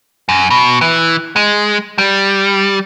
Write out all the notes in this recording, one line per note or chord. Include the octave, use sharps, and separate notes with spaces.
F#2
B2
E3
G#3
G3